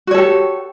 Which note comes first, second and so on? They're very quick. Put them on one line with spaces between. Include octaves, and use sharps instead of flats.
F#4 C#5 A4 G4